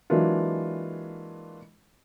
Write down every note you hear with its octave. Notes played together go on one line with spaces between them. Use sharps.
E3 F#3 G#3 A#3 D4 F4